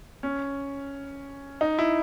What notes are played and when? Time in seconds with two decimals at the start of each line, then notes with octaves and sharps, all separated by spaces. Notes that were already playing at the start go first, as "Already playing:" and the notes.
0.23 C#4
1.61 D#4
1.79 E4